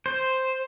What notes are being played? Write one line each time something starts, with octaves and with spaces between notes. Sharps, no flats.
C5